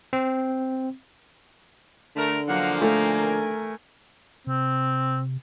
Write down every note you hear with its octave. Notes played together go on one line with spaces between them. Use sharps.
C4
D3 A3 A#4
F3 F#3 A#3 F#5
A3 A#4 G#5
C3 C4